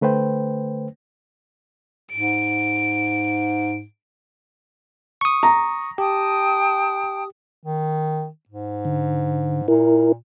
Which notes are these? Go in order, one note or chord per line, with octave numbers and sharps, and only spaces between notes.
D3 A3 B4 C5 G5
G#2 D7
C#6 D#6
A#5
G4 G5 A5 D#6
D#3
G#2
D3
A#2 E4 A#4